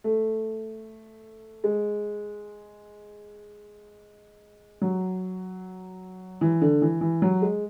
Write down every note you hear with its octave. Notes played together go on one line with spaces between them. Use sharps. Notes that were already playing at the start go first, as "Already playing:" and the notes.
A3
G#3
F#3
E3
D3
E3
E3
F#3
G#3